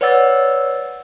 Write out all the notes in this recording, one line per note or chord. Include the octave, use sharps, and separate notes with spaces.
B4 C#5 D5 F#5 E6 A6